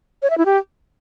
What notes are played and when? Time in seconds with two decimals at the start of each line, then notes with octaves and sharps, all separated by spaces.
0.22 C#5
0.30 E5
0.38 E4
0.45 G4